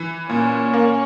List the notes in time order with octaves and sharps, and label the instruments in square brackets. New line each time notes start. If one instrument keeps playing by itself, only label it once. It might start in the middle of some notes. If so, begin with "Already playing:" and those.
Already playing: [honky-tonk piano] E3
[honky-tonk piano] A#2 [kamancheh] C#4
[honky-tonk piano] A#3